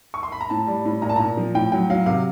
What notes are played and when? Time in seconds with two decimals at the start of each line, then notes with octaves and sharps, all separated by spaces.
0.14 C#6
0.23 C6
0.32 B5
0.41 A#5
0.50 A2 A5
0.67 G3
0.85 A2
1.02 A#2 A#5
1.09 A5
1.16 A#2 A#5
1.37 F3
1.55 A2 G5
1.72 F#3 G5
1.90 F#3 F5
2.06 C3 F5